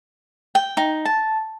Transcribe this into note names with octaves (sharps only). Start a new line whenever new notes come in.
G5
D#4
A5